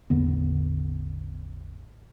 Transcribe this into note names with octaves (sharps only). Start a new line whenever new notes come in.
A1 E2 D3 B3